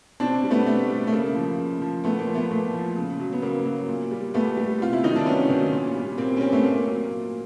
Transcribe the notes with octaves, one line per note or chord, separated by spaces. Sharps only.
B2 C4 D4
G3
A3 B3
B2 A3
G3
A3
C#3 A#3
F3
C#3
F3
A#2 A3 B3
A#3
F3
A3 B3
A#2 A3
F3
C#3
F#3
B3
C#3 A#3
F#3
A#2
G3
A#2 A3 B3
G3
C3 F4
E4
D#3 F#3 D#4
D4
C3 B3 C#4
D#3 F#3
A#2
G3
A#2 A#3 C4
C#4
G3 A#3 C4
A3 B3
A#2 A#3
F#3
A#2